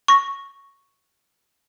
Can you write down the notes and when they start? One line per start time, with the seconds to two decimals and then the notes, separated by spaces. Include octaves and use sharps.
0.08 C#6 A#6